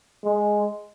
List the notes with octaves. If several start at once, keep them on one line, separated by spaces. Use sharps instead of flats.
G#3